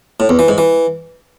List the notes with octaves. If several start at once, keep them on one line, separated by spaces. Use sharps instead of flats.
A2
E2
E3
G#2
E3